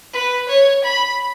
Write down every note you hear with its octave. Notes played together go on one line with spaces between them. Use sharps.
B4
C#5
B5